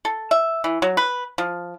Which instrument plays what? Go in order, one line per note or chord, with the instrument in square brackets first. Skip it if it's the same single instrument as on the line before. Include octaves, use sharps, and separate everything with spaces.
[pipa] A4
E5
E3
F#3
B4
F3